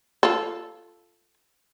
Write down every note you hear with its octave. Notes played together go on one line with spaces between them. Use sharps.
F4 A4